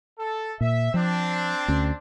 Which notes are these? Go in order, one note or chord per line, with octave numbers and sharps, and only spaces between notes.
A4
A#2 E5
F3 C4 D4
D2 C#4